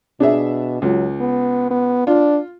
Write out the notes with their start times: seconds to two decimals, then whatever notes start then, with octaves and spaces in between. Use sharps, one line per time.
0.20 B2 D4 G#4 E5
0.82 C#2 F#3
1.20 B3
1.71 B3
2.07 D4 F4